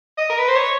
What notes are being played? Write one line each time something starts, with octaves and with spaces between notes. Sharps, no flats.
D#5
A#4
B4
C5
C#5